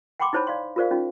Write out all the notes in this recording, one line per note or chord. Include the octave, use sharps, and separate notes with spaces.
F#5 G5 B5 C6 D6
D#4 E4 C5 C#5 A5 B5
D5 F5 C6
F4 G#4 A#4 C5 D5 F5
C#4 D#4 F4